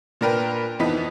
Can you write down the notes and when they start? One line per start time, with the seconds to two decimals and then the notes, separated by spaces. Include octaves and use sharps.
0.21 A#2 D4 A#4 B4 G5
0.79 F2 E3 B3 D#4 B4 B6